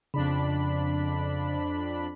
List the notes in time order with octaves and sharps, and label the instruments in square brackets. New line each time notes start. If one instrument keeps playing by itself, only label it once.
[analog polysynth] F2 D4 B5 [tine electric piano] C#3